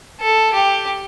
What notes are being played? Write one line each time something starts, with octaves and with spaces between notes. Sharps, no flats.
A4
G4